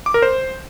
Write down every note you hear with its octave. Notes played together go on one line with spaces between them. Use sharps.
D6
A#4
C5